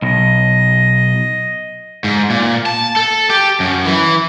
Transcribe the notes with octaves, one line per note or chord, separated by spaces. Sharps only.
B1 D#5
G#2
A#2
A5
A4
G4
F#2
E3